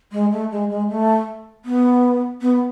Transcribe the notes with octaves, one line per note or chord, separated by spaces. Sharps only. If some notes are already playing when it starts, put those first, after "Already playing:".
G#3
A3
G#3
G#3
A3
B3
B3